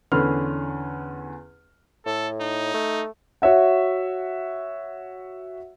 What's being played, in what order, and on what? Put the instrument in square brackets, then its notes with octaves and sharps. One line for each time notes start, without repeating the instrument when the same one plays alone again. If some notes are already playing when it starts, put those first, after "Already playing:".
[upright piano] E2 D3 C#4 B4 C6 F6
[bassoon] A2 [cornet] A4
[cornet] D#4
[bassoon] A3
[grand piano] F#4 C#5 E5 F#5